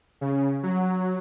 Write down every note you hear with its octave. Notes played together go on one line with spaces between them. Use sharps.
C#3
F#3